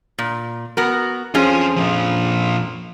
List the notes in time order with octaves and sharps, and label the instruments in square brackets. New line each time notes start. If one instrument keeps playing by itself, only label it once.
[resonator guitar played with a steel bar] A#2
B3 F#4 A#4
[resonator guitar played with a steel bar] F2 C#4 G#4 [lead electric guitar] F4 C5
[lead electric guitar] A#2 F3